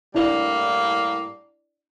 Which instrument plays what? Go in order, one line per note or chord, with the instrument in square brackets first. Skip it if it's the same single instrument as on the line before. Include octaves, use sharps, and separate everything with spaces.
[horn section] A2 G3 A#3 [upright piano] D4 E4 D5